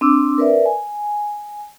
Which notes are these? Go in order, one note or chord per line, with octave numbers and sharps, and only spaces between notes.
C4 D4 D6 E6
A#4 B4 D5 E5
G#5